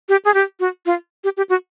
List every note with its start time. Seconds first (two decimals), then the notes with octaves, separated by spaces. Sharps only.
0.09 G4
0.25 G#4
0.34 G4
0.60 F#4
0.86 F4
1.24 G4
1.37 G4
1.49 F#4